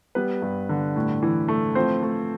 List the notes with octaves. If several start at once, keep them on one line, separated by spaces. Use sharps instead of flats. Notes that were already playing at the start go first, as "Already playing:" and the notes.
G3 B3 B4
G2
D3
A2
E3
A3
F3 C4 C5
A3